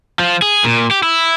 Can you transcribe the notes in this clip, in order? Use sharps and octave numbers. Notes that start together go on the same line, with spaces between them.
F3
G#4
A#2
G4
E4